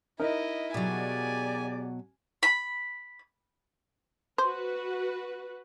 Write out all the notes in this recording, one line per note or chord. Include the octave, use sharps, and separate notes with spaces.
D#4 E4 A#4 D#5
B2 F#3 G4 G#4 D5 G#5
B5
F#4 B4 C5